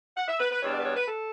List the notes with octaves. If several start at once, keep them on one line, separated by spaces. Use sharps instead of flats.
F#5
E5
B4
B4
E2 B2 G3 B3 D4 C#5
D5
B4
C#5
B4
A4